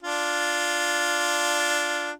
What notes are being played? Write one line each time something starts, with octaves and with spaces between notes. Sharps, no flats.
D4 F4